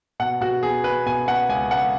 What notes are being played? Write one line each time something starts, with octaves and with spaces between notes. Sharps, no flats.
B2 F#5
B2 F#4
B3 G#4
B3 B4
B2 G#5
B3 F#5
C#2 G#5
C#2 F#5